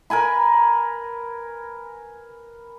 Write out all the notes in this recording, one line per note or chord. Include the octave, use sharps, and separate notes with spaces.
A#4 B4 G#5 B5